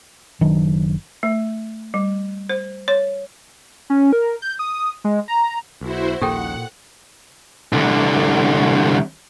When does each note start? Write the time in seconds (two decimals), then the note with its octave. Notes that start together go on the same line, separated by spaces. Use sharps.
0.41 F#1 D#3 F#3 D4
1.23 A3
1.94 G3
2.50 C5
2.88 C#5
3.90 C#4
4.13 A#4
4.42 G6
4.59 D#6
5.04 G#3
5.28 A#5
5.81 B1 E4 F#4 C5
6.21 D#1 A#1 A#2 G4 A4 F#5 G5
7.73 C2 D3